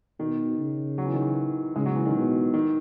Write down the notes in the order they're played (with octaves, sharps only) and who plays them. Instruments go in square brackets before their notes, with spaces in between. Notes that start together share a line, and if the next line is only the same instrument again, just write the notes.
[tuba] B2 [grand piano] D#3
[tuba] C#3
[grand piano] F#3
E3
D#3
E3
[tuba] C#3 [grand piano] G#3
[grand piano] F#3
E3
D#3
[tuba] B2
[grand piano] D#3